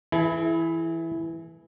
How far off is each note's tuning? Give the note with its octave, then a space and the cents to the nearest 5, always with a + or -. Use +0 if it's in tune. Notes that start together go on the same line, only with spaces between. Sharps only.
E3 +0 E4 +0 G#4 +45